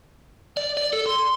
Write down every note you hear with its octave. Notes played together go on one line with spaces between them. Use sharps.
D5
D5
A4
C6